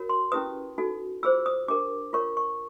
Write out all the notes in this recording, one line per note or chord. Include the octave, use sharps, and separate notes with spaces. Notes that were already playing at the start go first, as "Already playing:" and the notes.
Already playing: F#4 A#4 C#5
C6
C#4 E4 G4 B4 D#6
D#4 F#4 A4
F4 G#4 C5 E6
D#6
D4 G4 A#4 D6
F4 A#4 C#5 C#6
C#6